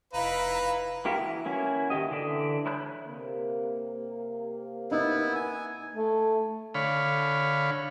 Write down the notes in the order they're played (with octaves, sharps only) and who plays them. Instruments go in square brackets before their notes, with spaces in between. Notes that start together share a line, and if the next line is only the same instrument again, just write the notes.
[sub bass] F1 [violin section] D#4 E4 A#5 [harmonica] B4 [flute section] F5
[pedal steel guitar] A#3 E4 F#4 G4 A#4
E3
A#3 C#4 E4 F#4
D#3 E3 G4 D#5
D3 E3 D5 E5
E4 C#5 B5 F#6 G6
[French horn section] C3 A#3
[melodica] B3 E4 [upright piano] D#4
[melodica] G#5
[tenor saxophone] A3
[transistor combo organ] D3 C#5 F5 B5